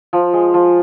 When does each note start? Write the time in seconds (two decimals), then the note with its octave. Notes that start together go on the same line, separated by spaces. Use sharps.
0.13 F3
0.34 G#3
0.54 F3